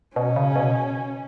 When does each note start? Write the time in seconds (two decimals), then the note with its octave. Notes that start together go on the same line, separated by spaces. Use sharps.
0.16 B2 C#4
0.36 C#3
0.56 B2